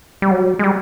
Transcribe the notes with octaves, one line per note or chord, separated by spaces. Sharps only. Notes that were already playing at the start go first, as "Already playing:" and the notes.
G3
F#3
G#3
G3